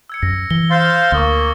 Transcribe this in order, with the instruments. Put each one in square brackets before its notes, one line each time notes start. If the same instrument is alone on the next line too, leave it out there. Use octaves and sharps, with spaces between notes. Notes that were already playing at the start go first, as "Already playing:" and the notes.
[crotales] E6 G#6 C#7
[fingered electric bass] F#2 [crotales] A#6
[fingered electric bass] E3 [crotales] G7
[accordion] C5 F5 C6 [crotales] A6
[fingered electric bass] D2 [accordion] A#3 [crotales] C#6 D#6 G7